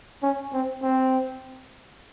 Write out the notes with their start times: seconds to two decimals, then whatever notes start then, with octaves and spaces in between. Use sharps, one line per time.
0.23 C#4
0.53 C4
0.82 C4